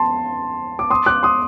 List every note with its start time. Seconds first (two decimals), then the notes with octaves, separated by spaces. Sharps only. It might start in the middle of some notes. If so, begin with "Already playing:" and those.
Already playing: A5 C6
0.79 D6
0.90 C6 D#6
1.06 D6 F#6
1.23 C6 D#6